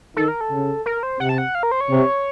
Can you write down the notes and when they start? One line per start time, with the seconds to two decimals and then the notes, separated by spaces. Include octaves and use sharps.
0.16 D#3 A4
0.28 A#4
0.41 A4
0.51 C#3
0.86 A#4
1.03 C5
1.20 C3 F#5
1.29 A5
1.38 F#5
1.55 F5
1.63 A#4
1.72 C5
1.81 C#5
1.90 C3